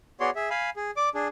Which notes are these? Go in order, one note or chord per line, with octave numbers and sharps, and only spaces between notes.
B3 F#4 G#4 C#5 D5 C6
G#4 E5
F5 G#5 B5
G#4
D5 D6
D4 G#4